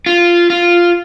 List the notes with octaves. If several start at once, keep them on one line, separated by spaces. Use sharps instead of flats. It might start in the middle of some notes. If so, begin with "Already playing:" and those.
F4
F4